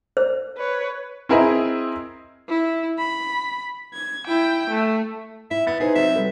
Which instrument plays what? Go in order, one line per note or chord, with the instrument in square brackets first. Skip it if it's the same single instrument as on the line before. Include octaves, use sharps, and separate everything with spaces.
[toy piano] C5
[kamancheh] B4 C#5
[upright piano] C4 E4 G#4 A#4 D#5 E5
[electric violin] E4
B5
G#6
E4 G5
A3
[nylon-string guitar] E4 [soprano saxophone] E5
[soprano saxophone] B3 [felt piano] A6
[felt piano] D#4 B4 C5 [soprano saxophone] G#4
[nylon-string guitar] C3 F#3 [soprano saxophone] E5
[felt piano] G3 A4 B4